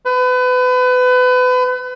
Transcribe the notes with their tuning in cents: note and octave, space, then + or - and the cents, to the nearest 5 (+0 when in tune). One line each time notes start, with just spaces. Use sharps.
B4 +30